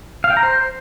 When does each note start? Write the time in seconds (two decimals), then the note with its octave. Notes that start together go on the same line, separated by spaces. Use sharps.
0.24 F5
0.30 G5
0.37 A#5
0.43 C5